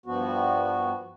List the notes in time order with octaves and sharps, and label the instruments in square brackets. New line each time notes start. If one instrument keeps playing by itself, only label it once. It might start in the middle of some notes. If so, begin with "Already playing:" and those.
[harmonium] G2 F3 B3 F#4